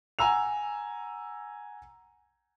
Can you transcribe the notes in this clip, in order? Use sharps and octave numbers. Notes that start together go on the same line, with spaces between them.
F#5 G#5 A#5 E6 F7